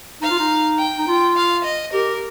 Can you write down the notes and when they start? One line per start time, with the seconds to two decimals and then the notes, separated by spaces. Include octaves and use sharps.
0.21 D#4 F5
0.30 F4
0.39 D#4
0.79 G5
0.98 D#4
1.08 F4
1.36 F5
1.65 D#5
1.93 G4 A#4